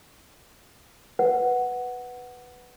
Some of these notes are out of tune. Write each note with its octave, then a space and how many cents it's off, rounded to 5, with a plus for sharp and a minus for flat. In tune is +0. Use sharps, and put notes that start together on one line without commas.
B4 +0 F#5 +0